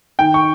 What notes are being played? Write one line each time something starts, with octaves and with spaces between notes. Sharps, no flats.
D#3 G5
C#6